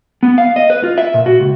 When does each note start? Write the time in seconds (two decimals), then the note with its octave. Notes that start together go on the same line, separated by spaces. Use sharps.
0.23 B3
0.38 F5
0.56 D#5
0.70 B4
0.83 F4
0.98 E5
1.14 A#2
1.26 F#4
1.40 C#2